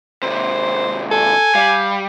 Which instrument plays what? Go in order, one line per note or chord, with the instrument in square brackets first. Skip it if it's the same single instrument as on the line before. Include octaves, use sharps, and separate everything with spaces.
[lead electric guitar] D#2 C3 [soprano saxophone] C5
[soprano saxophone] A4 [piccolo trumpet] G#5
[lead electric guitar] G3 [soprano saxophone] F5